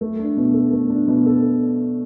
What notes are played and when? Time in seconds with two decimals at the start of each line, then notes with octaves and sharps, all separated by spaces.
0.01 A3
0.19 D4
0.37 B2
0.54 A4
0.72 A3
0.90 D4
1.08 B2
1.26 A4